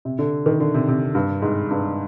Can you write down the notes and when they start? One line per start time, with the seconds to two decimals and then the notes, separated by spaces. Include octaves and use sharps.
0.05 C3
0.19 D3
0.46 D#3
0.60 D3
0.74 C3
0.88 C3
1.15 G2
1.42 G#2
1.71 G2